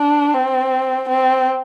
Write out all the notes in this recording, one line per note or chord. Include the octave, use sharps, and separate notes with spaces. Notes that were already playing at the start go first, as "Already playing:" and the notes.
Already playing: D4
C4
C4